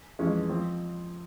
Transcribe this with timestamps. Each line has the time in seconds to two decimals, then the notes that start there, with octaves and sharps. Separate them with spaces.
0.19 F2 E3 G#3 C#4 F4
0.49 F3 C4